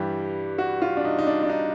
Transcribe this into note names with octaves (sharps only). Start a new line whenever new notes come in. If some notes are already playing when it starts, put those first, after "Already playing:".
Already playing: G2 E3 G3 G4
F#4
F4
D4
D#4
D#4
D4
D4
D#4